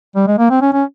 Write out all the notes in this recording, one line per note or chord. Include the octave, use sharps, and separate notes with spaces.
G3
G#3
A#3
C4
C#4
C#4